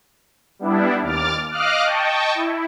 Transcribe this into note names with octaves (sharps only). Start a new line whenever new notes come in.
G3 B3 D4 E4
D#2 D6 F6 A6
D#5 F5 D6 D#6 F6 F#6
D#5 G5 A5 C#6
E4